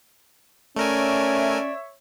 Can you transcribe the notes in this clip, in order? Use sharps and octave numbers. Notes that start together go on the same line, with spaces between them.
A3 C#4 A#4 C#5 D5 E5 G#5